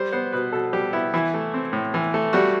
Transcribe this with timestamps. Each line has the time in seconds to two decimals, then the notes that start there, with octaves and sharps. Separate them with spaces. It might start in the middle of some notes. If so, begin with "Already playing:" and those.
Already playing: G3 C5
0.12 B3 C5
0.33 B2 B4
0.53 B2 A4
0.73 G3 G4
0.93 B3 E4
1.14 E3 E4
1.34 A3
1.54 C4
1.73 A2
1.94 E3
2.14 A3
2.33 G3 F#4